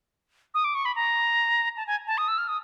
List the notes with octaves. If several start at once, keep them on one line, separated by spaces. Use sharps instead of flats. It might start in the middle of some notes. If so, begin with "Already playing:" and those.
D#6
D6
C#6
B5
A#5
A5
G#5
A5
D#6
E6
F6
D#6